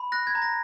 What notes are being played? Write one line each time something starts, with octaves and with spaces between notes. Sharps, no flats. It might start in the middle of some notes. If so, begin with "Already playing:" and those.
Already playing: B5
F#6 A#6
G#6
A#5
A#6